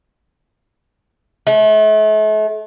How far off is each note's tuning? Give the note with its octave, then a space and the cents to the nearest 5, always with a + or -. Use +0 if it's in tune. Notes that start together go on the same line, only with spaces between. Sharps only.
A3 -40